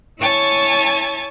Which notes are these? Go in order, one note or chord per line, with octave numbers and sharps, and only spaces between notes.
E4 C#5 G#5 A5 G#6 A6